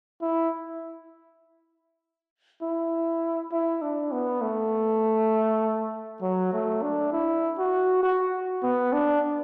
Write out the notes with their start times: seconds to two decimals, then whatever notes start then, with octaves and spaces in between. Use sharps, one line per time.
0.22 E4
2.62 E4
3.52 E4
3.82 D4
4.12 B3
4.42 A3
6.22 F#3
6.53 A3
6.82 D4
7.13 E4
7.58 F#4
8.03 F#4
8.63 B3
8.93 D4